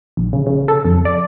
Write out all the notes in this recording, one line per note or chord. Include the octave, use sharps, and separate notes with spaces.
A#1
C#3
C#3
A4
F2
D5